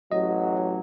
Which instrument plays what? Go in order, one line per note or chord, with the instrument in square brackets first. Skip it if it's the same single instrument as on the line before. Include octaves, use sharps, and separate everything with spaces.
[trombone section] A1 F#3 [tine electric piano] D#5